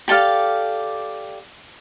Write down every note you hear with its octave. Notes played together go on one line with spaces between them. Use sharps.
G4 A4 D5 F5